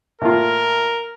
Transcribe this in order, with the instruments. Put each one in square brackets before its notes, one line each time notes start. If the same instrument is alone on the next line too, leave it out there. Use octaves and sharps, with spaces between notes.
[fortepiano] A2 A#3 F4 [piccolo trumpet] A#4